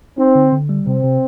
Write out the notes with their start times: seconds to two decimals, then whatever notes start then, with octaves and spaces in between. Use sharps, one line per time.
0.18 C4 D#4
0.35 D3
0.52 D3
0.69 G3
0.86 C3 C4
1.03 C3